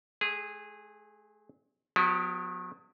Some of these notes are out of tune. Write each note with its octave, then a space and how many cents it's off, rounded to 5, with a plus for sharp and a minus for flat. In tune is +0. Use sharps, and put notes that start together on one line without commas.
A3 -45 G#4 -15
F#3 -40 B3 +10 G4 +0